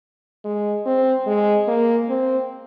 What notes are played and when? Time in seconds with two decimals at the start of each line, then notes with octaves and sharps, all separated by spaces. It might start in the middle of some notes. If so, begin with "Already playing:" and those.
0.45 G#3
0.86 C4
1.27 G#3
1.68 A#3
2.09 C4